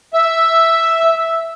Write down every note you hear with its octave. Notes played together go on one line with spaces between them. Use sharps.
E5